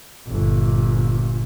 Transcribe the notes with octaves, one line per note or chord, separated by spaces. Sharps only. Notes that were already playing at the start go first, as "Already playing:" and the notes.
G1 A#2